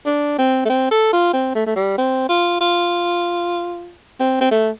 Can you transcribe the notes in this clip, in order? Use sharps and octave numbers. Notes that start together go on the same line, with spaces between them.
D4
C4
A3
C4
A4
F4
C4
A3
A3
G3
C4
F4
F4
C4
C4
A3